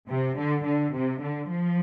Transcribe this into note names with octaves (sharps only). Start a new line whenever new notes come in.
C3
D3
D3
C3
D3
F3